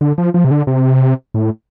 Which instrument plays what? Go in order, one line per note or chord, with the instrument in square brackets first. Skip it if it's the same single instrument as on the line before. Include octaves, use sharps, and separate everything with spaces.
[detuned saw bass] D3
F3
F3
C3
D3
C3
A2